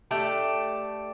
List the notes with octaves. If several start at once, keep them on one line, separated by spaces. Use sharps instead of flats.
A3 D4 G4